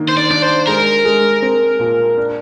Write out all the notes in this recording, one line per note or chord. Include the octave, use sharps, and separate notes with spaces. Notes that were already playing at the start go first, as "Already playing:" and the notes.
Already playing: D#3 A#3 D4
C5
D5
D4 D5
C5
G#3 A#4
G#3
C4
A#2
D4